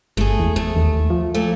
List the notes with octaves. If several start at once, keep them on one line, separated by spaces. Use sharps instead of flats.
G1 A3 G#4
E2
A3
D#2
F3
A#2 A3